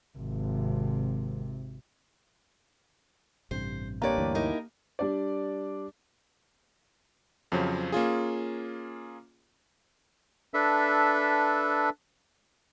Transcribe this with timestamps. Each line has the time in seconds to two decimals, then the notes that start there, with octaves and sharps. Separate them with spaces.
0.18 G#1 C3
3.51 A1 G2 C3 C5
4.02 A#3 D4 G4 B4 C#5 D5 A#5
4.18 D2 G2 E3
4.35 D#4 E4 A#4
4.99 G3 D4 D5
7.52 F2 C#3 F3 F#3
7.92 A#3 C#4 F4 G#4
10.54 D4 A4 B4 E5